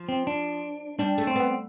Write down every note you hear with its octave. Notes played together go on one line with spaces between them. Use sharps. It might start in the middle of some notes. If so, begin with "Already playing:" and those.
Already playing: F3
C4
D4
G3 D4
A3
C4
B3